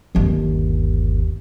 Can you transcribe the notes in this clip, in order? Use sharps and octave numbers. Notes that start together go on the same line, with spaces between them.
G1 D#2